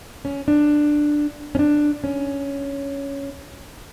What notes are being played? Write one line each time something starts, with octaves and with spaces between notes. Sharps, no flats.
C#4
D4
C#4
D4
C#4